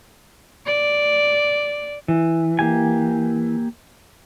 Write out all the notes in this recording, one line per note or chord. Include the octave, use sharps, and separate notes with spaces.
D5
E3
A#3 G4 G#5